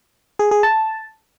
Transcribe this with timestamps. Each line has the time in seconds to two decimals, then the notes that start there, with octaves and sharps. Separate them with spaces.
0.39 G#4
0.51 G#4
0.63 A5